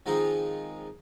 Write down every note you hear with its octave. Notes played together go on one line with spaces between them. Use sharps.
D#3 F3 G#3 C4 D#4 F4